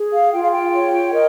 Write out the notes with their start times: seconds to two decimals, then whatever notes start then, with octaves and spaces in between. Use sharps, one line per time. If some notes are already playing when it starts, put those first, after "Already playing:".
Already playing: G#4
0.13 F5
0.33 F4 G5
0.42 F5
0.51 G5
0.73 C#5
1.12 A#4 D#5